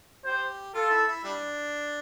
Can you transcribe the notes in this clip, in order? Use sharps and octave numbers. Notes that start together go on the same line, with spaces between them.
G4 C5
F4 A4
E4
E4
G3 D4